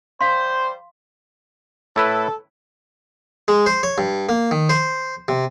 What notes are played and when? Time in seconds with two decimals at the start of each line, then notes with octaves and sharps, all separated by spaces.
0.21 G3 C5 F5 C6
1.96 A2 E4 A4 B4
3.48 G#3
3.66 C5
3.83 C#5
3.98 G2
4.29 A#3
4.51 D#3
4.69 C5
5.28 C3